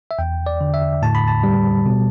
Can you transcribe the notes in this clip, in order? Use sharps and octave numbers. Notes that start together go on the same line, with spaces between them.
E5
E2 G5
D5
D3
E5
A2 A5
B5
A5
G3
B2